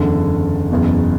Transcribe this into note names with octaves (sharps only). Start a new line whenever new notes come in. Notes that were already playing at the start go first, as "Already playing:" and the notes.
Already playing: F#1 E2 D3
F#1 E2 B2